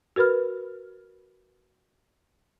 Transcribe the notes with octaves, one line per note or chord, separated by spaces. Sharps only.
F#4 A#4 B4 B5 F6